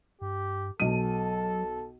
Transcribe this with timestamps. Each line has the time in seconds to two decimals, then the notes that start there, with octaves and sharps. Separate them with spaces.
0.22 G2 G4
0.80 B1 F#3 A4 D#7